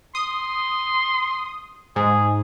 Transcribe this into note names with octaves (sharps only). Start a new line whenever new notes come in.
C6 D#6
G#2 G#4